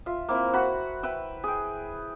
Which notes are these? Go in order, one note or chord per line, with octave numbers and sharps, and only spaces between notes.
F4 E5
A#3 C4 E4
F#4 F#5 B5
B4 E5 G5
G#4 G5